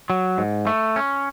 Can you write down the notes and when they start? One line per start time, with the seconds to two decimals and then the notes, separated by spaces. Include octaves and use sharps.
0.10 F#3
0.38 G#2
0.67 A3
0.96 C#4